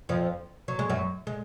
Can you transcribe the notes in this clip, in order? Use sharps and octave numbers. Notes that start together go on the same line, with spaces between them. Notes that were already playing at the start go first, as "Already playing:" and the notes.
F2 F3
F#3
G#3
F#2 F#3
G#3